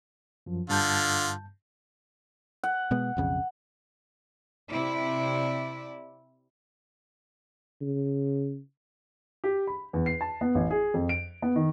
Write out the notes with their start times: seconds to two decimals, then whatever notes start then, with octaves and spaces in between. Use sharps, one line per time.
0.46 F#2 F3
0.70 G2 D3 F4 A5 G6
2.63 F#5
2.91 B2 G#3 B3
3.17 B1 F2 C#3
4.70 C3 E4 D5
7.81 C#3
9.44 G4
9.67 B5
9.93 E2
10.06 C7
10.21 A5
10.41 B3
10.55 A1
10.71 G#4
10.94 F2
11.09 D7
11.42 B3
11.56 D#3